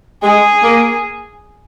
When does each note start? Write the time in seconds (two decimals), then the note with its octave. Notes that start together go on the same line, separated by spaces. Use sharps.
0.23 G#3 G#4
0.63 A#3